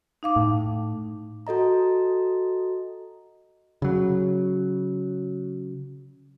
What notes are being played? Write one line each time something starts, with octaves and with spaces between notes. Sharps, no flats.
D#4 F5 D6
A2
F#4 A4 D#5 A#5
C#3 F#3